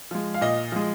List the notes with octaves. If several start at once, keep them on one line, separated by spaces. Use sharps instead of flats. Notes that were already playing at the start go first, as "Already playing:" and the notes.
F3 G#3
F5
A#2 D#5
F3 G#3